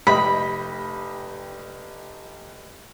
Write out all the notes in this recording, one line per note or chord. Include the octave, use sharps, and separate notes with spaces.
F1 G4 D#5 B5